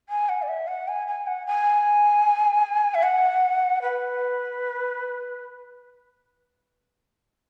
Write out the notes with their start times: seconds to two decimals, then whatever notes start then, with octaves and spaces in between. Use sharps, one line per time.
0.09 G#5
0.29 F#5
0.42 D5
0.48 E5
0.68 F#5
0.88 G#5
1.07 G#5
1.27 F#5
1.47 G#5
2.95 E5
3.03 F#5
3.82 B4